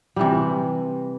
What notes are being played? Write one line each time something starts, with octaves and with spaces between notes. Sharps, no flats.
C3 E3 G3